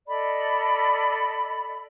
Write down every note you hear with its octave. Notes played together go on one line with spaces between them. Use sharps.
A4 D5 D#5 B5